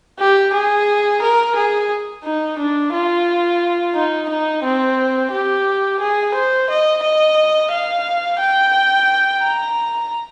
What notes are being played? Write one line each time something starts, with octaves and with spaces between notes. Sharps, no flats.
G4
G#4
A#4
G#4
D#4
D4
F4
D#4
D#4
C4
G4
G#4
C5
D#5
D#5
F5
G5
A#5